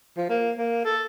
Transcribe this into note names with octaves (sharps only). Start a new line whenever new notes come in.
F3
A#3
A#3
A4